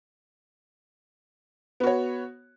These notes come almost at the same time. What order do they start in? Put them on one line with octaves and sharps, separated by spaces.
B3 F#4 C#5